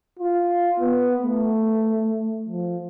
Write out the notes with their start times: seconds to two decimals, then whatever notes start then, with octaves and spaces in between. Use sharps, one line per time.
0.19 F4
0.80 B3
1.22 A3
2.49 F3